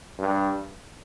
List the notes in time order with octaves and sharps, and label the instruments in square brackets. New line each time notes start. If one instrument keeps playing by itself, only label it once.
[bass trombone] G2